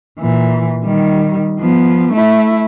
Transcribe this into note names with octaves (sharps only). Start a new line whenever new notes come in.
A#2 E3
D#3 G3
F3 B3
A3 E4